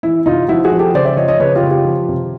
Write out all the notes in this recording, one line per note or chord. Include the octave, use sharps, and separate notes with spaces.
E3 E4
C3 D#4 F4
F3 E4 F#4
F#4 G#4
F3
G4 A4
C#3 C5 D5
D5 E5
F3 C#5 D#5
C#5 D#5
C#3 B4 C#5
F4 G4
C#3
F4 G4
F3
C3